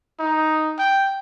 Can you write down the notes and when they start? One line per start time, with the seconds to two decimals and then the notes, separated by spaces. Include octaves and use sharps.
0.19 D#4
0.78 G5